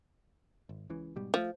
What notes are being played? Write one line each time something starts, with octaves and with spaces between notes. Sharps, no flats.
G#1
C#2 C#3 E3
G#2 B2 G3
F3 G#3 A3